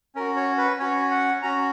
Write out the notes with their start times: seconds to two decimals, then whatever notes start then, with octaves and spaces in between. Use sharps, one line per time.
0.15 C#4 F#4 A#4
0.37 C#5
0.58 B4
0.80 C#4 F#4 C#5
1.11 F#5
1.42 C#4 F#4 A#5